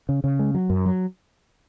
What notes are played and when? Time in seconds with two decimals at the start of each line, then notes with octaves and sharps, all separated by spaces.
0.09 C#3
0.24 C#3
0.39 G#3
0.55 F#3
0.70 F#2
0.86 F#3